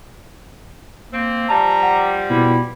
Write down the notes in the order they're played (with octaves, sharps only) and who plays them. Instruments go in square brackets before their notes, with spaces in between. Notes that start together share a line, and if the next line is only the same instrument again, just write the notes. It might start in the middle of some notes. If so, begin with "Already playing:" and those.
[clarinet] A#3 [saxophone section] C4
[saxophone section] F3 G3 [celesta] A5 [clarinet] A#5
[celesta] F#5
[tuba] B2 [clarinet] E4